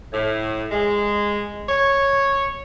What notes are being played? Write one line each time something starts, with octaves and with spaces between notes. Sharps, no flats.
A2
G#3
C#5